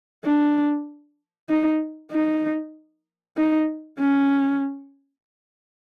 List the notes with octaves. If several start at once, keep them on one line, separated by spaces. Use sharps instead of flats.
D4
D#4
D#4
D#4
C#4